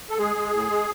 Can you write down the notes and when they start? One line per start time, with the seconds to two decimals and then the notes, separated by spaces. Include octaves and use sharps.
0.10 A4
0.18 G#3 G#4
0.36 G#3
0.53 A2
0.70 G#3